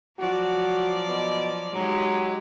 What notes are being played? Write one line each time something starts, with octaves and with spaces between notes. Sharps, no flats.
F3 F#3 F#4 D5
B2
F#3 G#3 D#4 G4